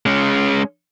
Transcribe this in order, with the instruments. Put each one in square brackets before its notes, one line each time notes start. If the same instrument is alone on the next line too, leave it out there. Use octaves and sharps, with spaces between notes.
[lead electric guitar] G#3 C#4